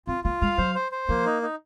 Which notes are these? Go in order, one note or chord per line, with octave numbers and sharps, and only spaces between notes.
C4 F4
A#3 F4
G#3 F5
F#3 C5
C5
C5
F3 A#3
D#4
D#4